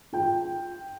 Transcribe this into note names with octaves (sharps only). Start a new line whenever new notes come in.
F4 G5